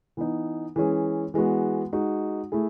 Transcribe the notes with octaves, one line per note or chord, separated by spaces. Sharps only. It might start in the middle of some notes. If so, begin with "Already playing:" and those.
E3 B3 D#4
E3 G#3 C#4 G#4
E3 G#3 B3 F#4
G#3 D#4 F#4
A3 E4 G#4